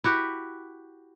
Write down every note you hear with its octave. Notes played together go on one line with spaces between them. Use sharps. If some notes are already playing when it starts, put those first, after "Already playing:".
E4 F#4 G4 B4